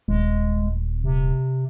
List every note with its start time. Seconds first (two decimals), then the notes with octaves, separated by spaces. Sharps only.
0.08 D#1 G#3
1.04 C3